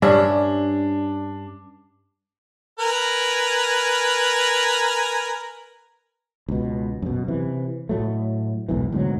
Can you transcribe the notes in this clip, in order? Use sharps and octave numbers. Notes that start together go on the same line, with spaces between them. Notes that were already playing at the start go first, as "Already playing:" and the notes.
G2 C#4 D4 E5
A#4 B4 G#5
C#2 B2
F#2 B2
C3 E3
A2 F#3 A3
B1 E2 G#2 E3
D2 G#2 B2 F#3